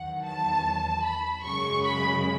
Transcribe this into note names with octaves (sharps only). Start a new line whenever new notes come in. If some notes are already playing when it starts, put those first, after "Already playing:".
Already playing: E2 D#3 F#3 F#5
A5
B5
F#2 C#3 G#3 C#6
B5